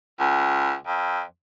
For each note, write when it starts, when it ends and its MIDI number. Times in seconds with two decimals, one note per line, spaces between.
0.20 0.74 37
0.87 1.22 41